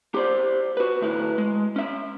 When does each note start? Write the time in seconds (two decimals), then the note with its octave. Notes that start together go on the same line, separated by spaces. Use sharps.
0.14 G4 C5 D5
0.77 F#4 B4
1.01 D2 A2 E4 B4
1.38 G#3
1.76 C#4 E5